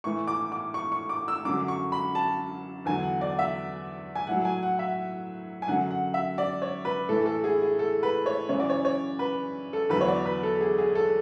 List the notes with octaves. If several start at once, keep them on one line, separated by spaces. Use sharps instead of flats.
A2 E3 C#6
D6
D6
C#6
C#6
D6
E6
F#2 D3 F#3 D6
C#6
B5
A5
E2 D3 F#3 G#5
F#5
D5
E5
G#5
A2 F#3 F#5
G#5
F#5
E5
G#5
F#2 D3 F#3 F#5
F#5
E5
D5
C#5
B4
A2 E3 A4
A4
G#4
G#4
A4
B4
C#5
F#2 C#3 E3 C#5
D5
C#5
C#5
B4
A4
E2 D3 F#3 B4
C#5
D5
B4
A4
G#4
G#4
A4